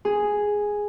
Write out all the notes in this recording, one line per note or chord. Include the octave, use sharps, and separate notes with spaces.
G#4